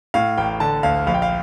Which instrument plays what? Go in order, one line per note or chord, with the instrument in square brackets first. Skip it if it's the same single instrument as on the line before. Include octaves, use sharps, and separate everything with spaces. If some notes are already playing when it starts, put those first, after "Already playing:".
[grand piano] A2 F5
A1 G5
D3 A5
D2 F5
A#1 F5
G5
F5